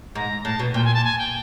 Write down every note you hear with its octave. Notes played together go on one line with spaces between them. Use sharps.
G#2 A#5
A2 A5
B2
A#2 G5
G#5
A5
G#5
G5